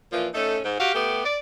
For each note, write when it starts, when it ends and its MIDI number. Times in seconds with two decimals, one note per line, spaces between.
0.12 0.27 46
0.12 0.27 52
0.12 0.27 53
0.33 0.58 57
0.33 0.58 61
0.33 0.58 63
0.33 0.58 69
0.64 0.76 44
0.79 0.92 66
0.79 0.92 67
0.79 0.92 77
0.94 1.20 57
0.94 1.20 59
0.94 1.20 67
1.24 1.37 74